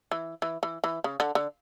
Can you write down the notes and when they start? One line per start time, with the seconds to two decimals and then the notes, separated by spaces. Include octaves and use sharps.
0.11 E3
0.42 E3
0.63 E3
0.84 E3
1.04 C#3
1.20 D3
1.35 D3